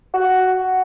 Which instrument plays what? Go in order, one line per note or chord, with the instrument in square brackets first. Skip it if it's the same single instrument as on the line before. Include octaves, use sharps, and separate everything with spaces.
[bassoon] F#4